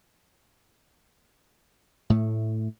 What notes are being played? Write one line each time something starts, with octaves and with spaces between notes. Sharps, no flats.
A2 A3